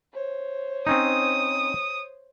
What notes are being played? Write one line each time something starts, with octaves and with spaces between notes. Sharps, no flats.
C5 C#5
C4 C#4 D#4 D#6